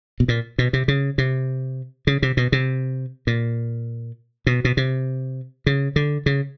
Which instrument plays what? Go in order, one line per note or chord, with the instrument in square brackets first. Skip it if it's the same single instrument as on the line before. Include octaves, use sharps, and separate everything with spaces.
[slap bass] B2
A#2
B2
C3
C#3
C3
C#3
C3
B2
C3
A#2
B2
B2
C3
C#3
D3
C#3